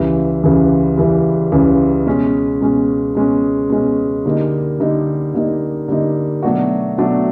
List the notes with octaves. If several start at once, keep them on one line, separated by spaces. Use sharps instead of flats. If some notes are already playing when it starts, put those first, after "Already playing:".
Already playing: C#2 C#3 E3 G3
C#2 C#3 E3 G3
C#2 C#3 E3 G3
C#2 C#3 E3 G3
B2 G#3 C#4
B2 G#3 C#4
B2 G#3 C#4
B2 G#3 C#4
D3 G3 A#3 D#4
D3 G3 A#3 D#4
D3 G3 A#3 D#4
D3 G3 A#3 D#4
B2 F#3 A3 D4 F#4
B2 F#3 A3 D4 F#4